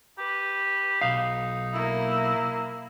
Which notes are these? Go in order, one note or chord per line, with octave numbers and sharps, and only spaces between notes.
G4 B4
B1 D#4 F5
A#3 E4